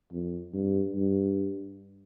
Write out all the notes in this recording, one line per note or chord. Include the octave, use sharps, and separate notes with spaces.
F2
G2
G2